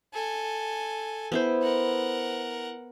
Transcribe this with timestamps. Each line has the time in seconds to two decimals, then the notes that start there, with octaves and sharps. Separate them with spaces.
0.13 A4 G#5
1.32 B3 E4 C5
1.62 A#4 F#5